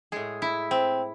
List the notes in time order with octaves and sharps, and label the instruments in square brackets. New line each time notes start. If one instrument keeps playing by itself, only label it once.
[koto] A2 G#3 G#4
E4
C4